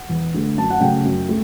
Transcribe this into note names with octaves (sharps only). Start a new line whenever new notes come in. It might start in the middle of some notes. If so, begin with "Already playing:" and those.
Already playing: F#5
E2
D3 A3
F#2 A5
F#5
C#3 F#3 A3 G5
F#2
A3